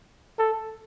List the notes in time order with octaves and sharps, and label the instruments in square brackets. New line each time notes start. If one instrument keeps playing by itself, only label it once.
[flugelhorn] A4